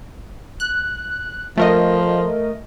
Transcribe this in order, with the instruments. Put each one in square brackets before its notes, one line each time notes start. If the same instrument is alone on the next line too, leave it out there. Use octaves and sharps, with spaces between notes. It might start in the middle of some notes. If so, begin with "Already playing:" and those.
[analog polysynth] F#6
[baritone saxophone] F3 [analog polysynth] A3 A#4 D#5